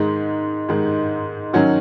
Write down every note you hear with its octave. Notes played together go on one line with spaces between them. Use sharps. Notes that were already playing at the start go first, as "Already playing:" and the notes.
Already playing: G#2 D#3 G#3
G#2 D#3 G#3
D#3 F#3 C#4 F#4